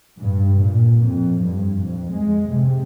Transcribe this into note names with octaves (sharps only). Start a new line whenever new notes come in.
G2
A#2
F2
G2
F2
G#3
C3